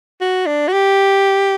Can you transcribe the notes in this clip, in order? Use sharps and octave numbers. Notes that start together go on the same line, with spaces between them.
F#4
D4
F#4
G4